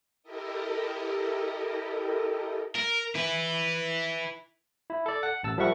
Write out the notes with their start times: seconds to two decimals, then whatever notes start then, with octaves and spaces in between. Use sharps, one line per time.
0.23 E4 G4 A4 A#4 D#5
2.75 A#4
3.15 E4 B4
4.90 E4
5.06 A4 D5
5.23 F#5
5.43 A1 A5 E6
5.58 F3 G3 A#4 E5 F#5 C#6